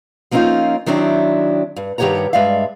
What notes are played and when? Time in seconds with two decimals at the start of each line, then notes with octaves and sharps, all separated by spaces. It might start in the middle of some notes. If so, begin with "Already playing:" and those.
0.31 F3 A#3 C4 C#4 D#4 F4
0.86 D#3 F#3 C4 D4 E4
1.76 G2
1.98 G2 D#3 G4 C#5 F#5 A#5
2.33 G2 G#3 D5 E5 F5